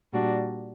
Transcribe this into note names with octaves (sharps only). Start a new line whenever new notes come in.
A#2 G3 D4 F#4